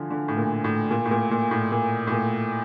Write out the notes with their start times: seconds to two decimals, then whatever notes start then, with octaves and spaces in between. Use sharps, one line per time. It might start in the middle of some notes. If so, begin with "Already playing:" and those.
Already playing: D3 E3 F3
0.10 D3
0.28 A2
0.37 A#2
0.64 A2
0.91 A#2
1.06 A2
1.11 A#2
1.31 A#2
1.51 A2
1.72 A#2
2.07 A2
2.12 A#2